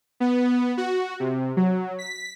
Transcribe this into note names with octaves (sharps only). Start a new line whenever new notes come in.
B3
F#4
C3
F#3
B6